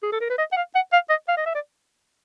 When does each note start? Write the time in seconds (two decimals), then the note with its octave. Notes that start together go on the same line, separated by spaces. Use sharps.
0.03 G#4
0.12 A4
0.21 A#4
0.29 B4
0.38 D#5
0.52 F#5
0.57 F5
0.75 F#5
0.93 F5
1.09 D#5
1.28 F5
1.37 D#5
1.46 E5
1.55 D5